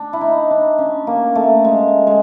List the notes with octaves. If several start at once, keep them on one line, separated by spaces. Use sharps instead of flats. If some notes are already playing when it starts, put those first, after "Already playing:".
Already playing: D4
E4
D#4
D4
C#4
A#3
A3
G#3
G#3